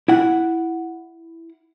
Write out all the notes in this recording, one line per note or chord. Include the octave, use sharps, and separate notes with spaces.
E4 F#5